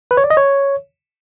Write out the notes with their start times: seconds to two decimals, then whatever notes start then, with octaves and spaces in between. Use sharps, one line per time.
0.11 B4
0.17 C#5
0.24 D5
0.30 D#5
0.37 C#5